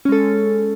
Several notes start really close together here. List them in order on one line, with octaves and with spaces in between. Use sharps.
C#4 G#3 A4